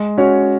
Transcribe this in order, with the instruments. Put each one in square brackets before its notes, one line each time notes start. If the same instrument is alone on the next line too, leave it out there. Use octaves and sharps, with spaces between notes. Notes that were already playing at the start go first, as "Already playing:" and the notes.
Already playing: [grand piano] G#3
C#4 F#4 C#5